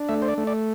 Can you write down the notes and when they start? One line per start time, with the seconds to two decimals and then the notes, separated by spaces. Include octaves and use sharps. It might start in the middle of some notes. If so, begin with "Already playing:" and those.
Already playing: D4
0.09 A3 E5
0.22 C5
0.28 D5
0.38 A3
0.47 D5